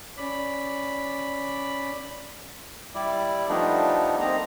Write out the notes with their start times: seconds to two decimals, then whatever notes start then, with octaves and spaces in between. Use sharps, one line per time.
0.18 C#4 D5 B5
2.95 G3 E4 D5
3.49 F3 G3 A3 B3 D4 D#4
4.20 A#3 C4 D#4 A#5